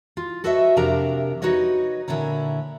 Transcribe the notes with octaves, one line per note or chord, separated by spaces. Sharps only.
F4
F#4 A4 B4 C#5 D#5 E5
F2 C3 D4 G4 A#4 A#5
D#4 F#4 B4 C#5 D#5
A#2 D3 E4 C#5 A#5